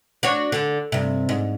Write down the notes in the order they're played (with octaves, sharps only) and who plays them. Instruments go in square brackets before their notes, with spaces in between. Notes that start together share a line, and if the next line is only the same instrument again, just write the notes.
[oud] D4 F#4 C#5
D3
G2 C3
G#2